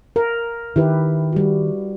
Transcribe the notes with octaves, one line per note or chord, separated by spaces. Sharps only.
A#4
D#3 E4 G4 B4
G3 F#4